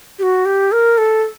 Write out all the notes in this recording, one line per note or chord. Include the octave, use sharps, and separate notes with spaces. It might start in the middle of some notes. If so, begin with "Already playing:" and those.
G4
F#4
G4
A#4
A4